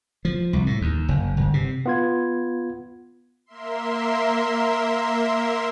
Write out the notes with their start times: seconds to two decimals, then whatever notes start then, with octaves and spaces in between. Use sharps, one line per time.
0.25 F3
0.53 C2
0.66 A2
0.81 D#2
1.09 F#1
1.37 G1
1.54 C3
1.86 B3 F4 G#6
3.46 A#3 A#4 E5 C6